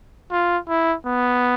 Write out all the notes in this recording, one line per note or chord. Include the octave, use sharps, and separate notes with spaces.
F4
E4
B3